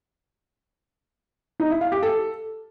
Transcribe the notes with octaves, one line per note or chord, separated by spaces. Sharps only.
D#4
E4
F5
G4
A4